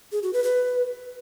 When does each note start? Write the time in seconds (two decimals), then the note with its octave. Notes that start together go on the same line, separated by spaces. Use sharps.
0.12 G#4
0.23 F#4
0.33 B4
0.44 B4